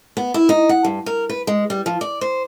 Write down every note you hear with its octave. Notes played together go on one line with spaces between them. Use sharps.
B3
E4
D#4
F#5
G2
A#4
B4
G#3
G3
F3
D5
C5